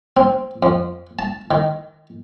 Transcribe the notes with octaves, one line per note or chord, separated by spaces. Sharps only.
C4
F2
A5
D#3